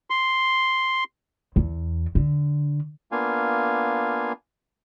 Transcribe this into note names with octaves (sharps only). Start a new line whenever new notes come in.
C6
E2
D3
A#3 B3 D4 F4 F5 G#5